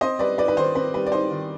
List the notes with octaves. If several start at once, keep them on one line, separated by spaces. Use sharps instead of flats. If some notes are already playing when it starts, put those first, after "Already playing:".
C4 C5 D#5
G3 B4 D5
D#4 B4 D5
B4
D#3 C5
C4 B4
G3 B4
D5
D#4 C5
D#3